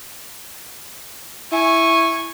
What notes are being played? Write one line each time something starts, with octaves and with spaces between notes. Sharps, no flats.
E4 G#5 C#6